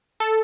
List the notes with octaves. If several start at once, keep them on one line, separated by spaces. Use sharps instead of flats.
A4